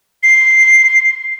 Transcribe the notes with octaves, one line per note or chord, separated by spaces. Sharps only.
C7